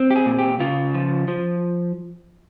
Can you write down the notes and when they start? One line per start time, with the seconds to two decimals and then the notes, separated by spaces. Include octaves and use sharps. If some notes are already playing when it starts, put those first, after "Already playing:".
Already playing: C4
0.11 G4
0.16 G#4
0.26 A#2
0.39 G4
0.60 C#3 F4
0.94 F3
1.28 F3